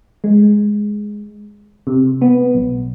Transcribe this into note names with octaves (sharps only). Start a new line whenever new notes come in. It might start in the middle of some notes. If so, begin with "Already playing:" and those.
G#3
C3
B3
B1